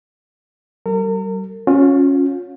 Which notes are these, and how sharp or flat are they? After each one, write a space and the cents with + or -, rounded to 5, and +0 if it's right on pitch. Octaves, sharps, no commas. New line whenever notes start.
G3 -40 A#4 -40
C#4 +0 F4 +40